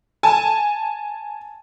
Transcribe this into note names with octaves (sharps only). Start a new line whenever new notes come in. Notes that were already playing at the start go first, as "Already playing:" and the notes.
G#5 A5